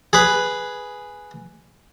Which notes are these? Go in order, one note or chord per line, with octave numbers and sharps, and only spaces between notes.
G#4 B4